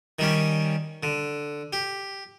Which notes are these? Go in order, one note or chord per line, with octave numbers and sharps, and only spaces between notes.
D#3 G3 C#4
D3
G4